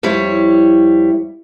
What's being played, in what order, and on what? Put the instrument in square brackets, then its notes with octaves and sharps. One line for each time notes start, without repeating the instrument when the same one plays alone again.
[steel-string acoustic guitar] F2 G3 E4 C#5